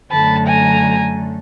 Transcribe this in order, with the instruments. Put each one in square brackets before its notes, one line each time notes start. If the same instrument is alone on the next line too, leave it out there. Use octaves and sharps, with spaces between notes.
[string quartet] F#2 D3 F#3 A3 A5 B5
G#5 A#5